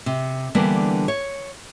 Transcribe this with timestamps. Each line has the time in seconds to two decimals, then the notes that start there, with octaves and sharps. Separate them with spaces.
0.06 C3
0.55 D3 E3 G3 A#3 B3 D4
1.08 C#5